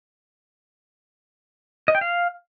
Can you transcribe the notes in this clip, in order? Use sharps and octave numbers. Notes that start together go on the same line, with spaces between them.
D#5
G5
F5